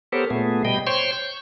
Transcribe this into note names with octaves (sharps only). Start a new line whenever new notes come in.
B3 G4 A4 A#4 C5 C#5
A#2 A3 B3 G#4
B2 G3 D#5 G5
C5 C#5 G5 C6 C#6
C#6 G6